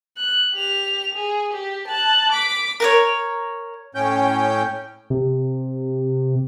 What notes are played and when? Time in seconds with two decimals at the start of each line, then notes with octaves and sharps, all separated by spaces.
0.17 F#6
0.53 G4 F7
1.14 G#4
1.53 G4
1.87 A5 F#6
2.31 D6 B6
2.80 A#4 B4 C#5
3.95 A2 C#4 G5 G6
5.10 C3